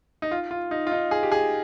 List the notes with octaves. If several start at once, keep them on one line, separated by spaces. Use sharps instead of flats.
D#4
F4
F4
D#4
F4
D#4
G#4
G4
G#4